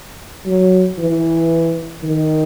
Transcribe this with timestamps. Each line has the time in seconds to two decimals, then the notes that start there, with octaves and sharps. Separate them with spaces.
0.46 F#3
0.98 E3
2.03 D#3